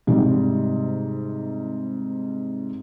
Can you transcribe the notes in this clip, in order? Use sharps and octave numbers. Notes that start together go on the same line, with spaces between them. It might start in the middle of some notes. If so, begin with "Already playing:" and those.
G#2 C3 G3